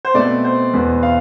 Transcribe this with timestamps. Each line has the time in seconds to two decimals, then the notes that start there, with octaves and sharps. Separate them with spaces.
0.05 C5
0.14 B2 A3 C4 D5
0.44 C5
0.73 E2 B2 B3
1.03 F5